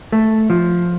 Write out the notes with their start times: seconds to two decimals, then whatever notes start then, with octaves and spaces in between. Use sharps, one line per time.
0.12 A3
0.50 F3